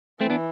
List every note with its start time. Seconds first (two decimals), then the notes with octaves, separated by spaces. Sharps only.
0.21 E3 A3 C4
0.30 B3 D4